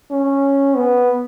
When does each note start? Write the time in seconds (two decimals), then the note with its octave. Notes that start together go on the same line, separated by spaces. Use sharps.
0.11 C#4
0.76 B3